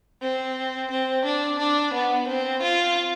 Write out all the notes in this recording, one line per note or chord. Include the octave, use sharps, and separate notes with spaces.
C4
C4
D4
D4
B3
C4
F4